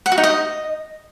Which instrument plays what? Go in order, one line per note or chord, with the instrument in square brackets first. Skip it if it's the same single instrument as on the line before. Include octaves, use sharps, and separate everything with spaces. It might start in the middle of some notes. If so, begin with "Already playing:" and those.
[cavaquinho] F#5
F#4
D#4
D#5